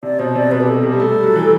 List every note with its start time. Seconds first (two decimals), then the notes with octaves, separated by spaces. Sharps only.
0.03 C3 D5
0.19 B2 C5
0.35 C3 D5
0.51 B2 B4
0.60 G4
0.68 A4
0.83 C3 G4
0.92 G3
1.00 A3 A4
1.12 G3
1.24 F#3
1.36 E3